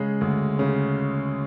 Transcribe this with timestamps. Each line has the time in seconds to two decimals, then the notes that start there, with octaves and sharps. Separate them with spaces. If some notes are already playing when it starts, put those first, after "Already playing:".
Already playing: C#3 G#3
0.21 D2
0.59 C#3